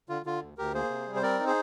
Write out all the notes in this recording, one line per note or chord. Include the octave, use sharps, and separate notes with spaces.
D3 F4
D3 F4
D2
D2 G4 A#4
A#3 G#4 C5
C3
G3
C5
C4 A#4 D5
D#4
G#4 C5